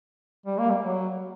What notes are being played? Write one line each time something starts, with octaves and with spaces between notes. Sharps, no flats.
G3
A#3
G3
F#3